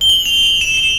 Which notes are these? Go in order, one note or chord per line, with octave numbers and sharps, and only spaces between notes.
G7
F#7
F7
F7
E7
E7